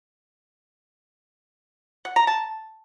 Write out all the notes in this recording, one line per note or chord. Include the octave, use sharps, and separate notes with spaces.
F#5
A#5
A5